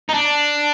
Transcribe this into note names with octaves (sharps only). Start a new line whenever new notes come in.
D#4
D4